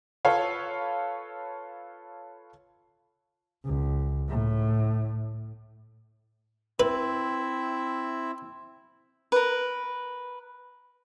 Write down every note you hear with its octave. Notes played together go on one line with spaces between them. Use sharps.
F4 A4 B4 C#5 F5
C#2
A2
C4 E4 B4 E5
A#4 B4